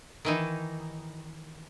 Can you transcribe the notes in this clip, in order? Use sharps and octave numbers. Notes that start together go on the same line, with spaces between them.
D#3 E3 D#4